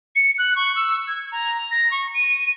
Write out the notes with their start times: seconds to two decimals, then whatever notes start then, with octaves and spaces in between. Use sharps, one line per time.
0.16 C#7
0.38 F#6
0.56 C#6
0.76 E6
1.08 G#6
1.32 A#5
1.71 A#6
1.91 C#6
2.14 D#7